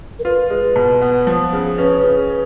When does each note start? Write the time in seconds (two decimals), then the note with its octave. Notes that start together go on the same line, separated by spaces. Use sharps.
0.19 A#4
0.24 F4 B4
0.50 G#3
0.76 B2
1.01 B3
1.27 F3
1.53 C#3
1.78 C#4 B4
2.04 C#3